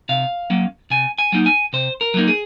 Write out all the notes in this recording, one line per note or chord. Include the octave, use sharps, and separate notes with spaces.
C3 F5
F#3 A#3 C#4
C3 G#5
G#5
F#3 A#3 D#4
G#5
C3 C5
A#4
F#3 A#3 D#4
G#4